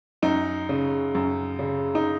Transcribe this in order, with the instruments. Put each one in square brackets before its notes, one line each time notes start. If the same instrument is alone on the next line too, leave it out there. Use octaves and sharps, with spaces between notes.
[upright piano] F#2 D#4
C#3
F#2
C#3
D#4